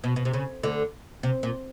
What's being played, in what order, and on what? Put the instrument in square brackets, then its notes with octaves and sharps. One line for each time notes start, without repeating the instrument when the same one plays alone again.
[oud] B2
B2
C3
C#3
D2 D3
C3
A#2